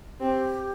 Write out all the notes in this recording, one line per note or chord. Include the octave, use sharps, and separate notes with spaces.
C4 G4